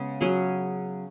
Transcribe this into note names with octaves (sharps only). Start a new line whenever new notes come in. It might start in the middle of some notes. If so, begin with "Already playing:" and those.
Already playing: C#3 G#3 B3
F#3 C#4 G#4